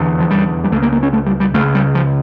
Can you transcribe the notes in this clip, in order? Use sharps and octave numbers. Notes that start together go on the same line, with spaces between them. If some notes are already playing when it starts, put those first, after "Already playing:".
Already playing: F1 E2 D3
F3
G3
G3
C#2 C#3 A3
A#3
A#3
C#4
A3
G3
G3
C#2 C#3 A3
G3
F3